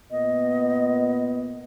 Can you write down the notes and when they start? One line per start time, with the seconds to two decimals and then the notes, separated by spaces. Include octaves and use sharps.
0.11 A#2 B3 D#5